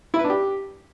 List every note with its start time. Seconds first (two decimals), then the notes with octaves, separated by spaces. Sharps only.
0.14 E4
0.19 B4
0.24 D4
0.30 G4